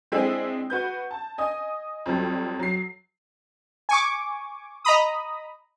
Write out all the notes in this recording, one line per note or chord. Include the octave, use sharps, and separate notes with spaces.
G#3 C4 D4 E4 G#4 G#5
F#4 B4 G6
A5
D#5 G#5 D#6
F2 F#3 G3
F#3 C7
G#5 C#6 D6
D#5 A#5 B5 D#6